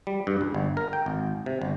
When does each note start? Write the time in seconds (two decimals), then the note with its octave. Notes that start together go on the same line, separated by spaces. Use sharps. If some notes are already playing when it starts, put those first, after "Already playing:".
0.07 G3
0.27 G2
0.41 C#2
0.55 G1
0.77 A#4
0.93 G5
1.06 G#1
1.46 C3
1.62 G1